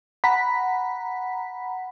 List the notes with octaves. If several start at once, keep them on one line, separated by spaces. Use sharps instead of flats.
F#5 A#5 B5 B6